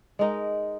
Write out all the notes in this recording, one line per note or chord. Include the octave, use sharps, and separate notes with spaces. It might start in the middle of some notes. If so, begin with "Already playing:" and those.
G#3 D#4 A#4